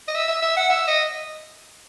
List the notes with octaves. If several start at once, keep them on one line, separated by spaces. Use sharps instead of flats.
D#5
E5
E5
E5
F#5
E5
D#5